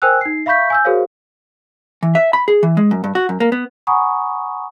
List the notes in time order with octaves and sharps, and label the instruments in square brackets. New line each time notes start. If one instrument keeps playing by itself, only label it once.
[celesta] A#4 C5 G5 G#5 E6 F#6
D#4 C7
E5 F5 B5 C#6 G6 B6
G#5 E6 G6
F#4 G#4 A#4 C5 C#5 F5
[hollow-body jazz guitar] E3
E5
B5
G#4
E3
G#3
F#2
G2
F#4
F#2
A#3
B3
[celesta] F#5 G#5 A#5 B5 C#6 D#6